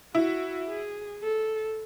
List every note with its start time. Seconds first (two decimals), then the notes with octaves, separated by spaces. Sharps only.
0.15 E4 F#4
0.68 G#4
1.23 A4